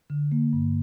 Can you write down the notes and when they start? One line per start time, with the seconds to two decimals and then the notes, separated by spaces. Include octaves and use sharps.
0.10 D3
0.32 A#3
0.53 G2